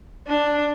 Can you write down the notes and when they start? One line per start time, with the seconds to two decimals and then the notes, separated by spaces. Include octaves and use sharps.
0.27 D4